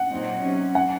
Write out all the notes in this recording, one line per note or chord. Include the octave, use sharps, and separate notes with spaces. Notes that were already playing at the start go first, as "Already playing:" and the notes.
Already playing: F#5
A#2 F#3 C4 D#4
C3 F#3 C#4
F#5